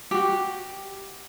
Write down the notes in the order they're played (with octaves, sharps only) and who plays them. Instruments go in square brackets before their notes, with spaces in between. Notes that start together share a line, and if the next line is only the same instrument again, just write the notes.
[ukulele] F#4 G4